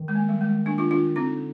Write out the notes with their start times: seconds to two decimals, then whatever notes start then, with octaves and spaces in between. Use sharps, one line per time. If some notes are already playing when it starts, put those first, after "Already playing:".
Already playing: D#3
0.08 G#3
0.15 A#3
0.29 G3
0.41 G#3
0.66 A#3 D4
0.78 D4 F4
0.91 D4 F4
1.16 D3 C4 D#4